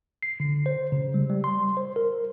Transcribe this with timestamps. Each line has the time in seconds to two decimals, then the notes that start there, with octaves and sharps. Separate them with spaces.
0.23 C7
0.40 D3
0.66 C5
0.92 C#3
1.14 G3
1.29 G3
1.44 C6
1.77 C5
1.96 A#4